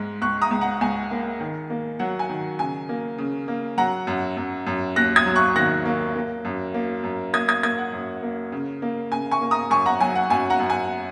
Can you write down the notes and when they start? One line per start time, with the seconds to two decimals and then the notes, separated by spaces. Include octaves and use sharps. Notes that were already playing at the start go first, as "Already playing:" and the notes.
Already playing: G#2 G#3
0.22 C#2 C#6 F#6
0.42 A#5 D#6
0.51 C#2
0.61 F#5 A#5
0.81 C#2 G#5
1.11 A#3
1.40 D#3
1.70 A#3
1.99 F#3 F#5
2.19 G#5
2.29 D#3
2.59 C#3 G#5
2.89 A#3
3.18 C#3
3.48 A#3
3.78 F#3 F#5 A#5
4.07 F#2
4.37 F#2
4.67 F#2
4.96 D#2 F#6 A#6
5.16 D#6 G#6
5.26 F#3
5.36 C#6 F#6
5.56 D#3 F#6 A#6
5.85 A#3
6.16 A#3
6.45 F#2
6.74 A#3
7.04 F#2
7.34 A#3 D#6 G#6
7.48 D#6 G#6
7.63 A#3 D#6 G#6
7.78 F#5
7.93 F#2
8.23 A#3
8.52 C#3
8.82 A#3
9.12 C#3 G#5
9.31 G#5 C#6
9.41 A#3
9.51 A#5 D#6
9.70 F#2 G#5 C#6
9.86 F#5 A#5
10.01 F#3 G#5
10.16 F#5
10.30 F#2 G#5
10.50 F#5 A#5
10.60 F#2
10.70 G#5